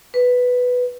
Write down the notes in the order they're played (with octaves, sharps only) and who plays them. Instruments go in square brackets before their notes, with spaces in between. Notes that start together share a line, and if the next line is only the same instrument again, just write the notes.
[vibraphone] B4